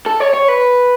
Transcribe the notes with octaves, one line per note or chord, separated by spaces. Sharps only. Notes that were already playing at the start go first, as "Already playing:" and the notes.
A4
C#5
C#5
B4